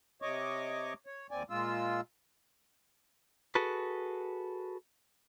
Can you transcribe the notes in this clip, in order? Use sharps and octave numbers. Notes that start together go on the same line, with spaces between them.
C3 C#5 D#5 C#6 D6
C#5
D#2 C4 D5 G#5
A#2 G#3 F4 E6
F#4 G#4 A4 B4